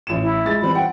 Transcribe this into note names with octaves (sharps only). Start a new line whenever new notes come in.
A1 E7
E4
G#3 A6
E3 G3 C4 B5
F#5 G5